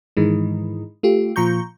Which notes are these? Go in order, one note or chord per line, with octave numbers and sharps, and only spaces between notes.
G#2 D#3 E3 G#3
A3 F4 G4
A#2 F3 A#5 C#6 G6